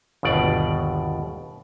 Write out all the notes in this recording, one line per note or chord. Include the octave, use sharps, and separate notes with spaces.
G1 D#2 B2 D5